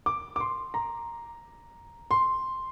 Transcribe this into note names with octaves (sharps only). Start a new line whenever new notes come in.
D6
D6
C6
A#5
C6